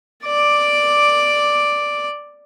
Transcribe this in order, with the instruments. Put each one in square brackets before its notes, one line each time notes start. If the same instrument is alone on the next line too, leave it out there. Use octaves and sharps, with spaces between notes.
[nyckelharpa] D5 D6